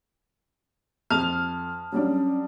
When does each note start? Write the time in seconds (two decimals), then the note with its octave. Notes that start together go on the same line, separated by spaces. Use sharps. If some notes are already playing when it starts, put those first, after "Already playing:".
1.10 F2 A5 D#6 F6
1.92 F#3 G3 C#4 D4